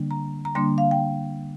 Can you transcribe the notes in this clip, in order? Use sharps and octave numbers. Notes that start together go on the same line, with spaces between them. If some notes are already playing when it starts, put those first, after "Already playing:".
Already playing: D3 G3 A#3 D4
A#5
A#5
D3 G3 A#3 D4 C6
F5
G5